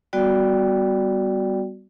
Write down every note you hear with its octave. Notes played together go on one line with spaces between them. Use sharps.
G3 B3 F#4 D5 G5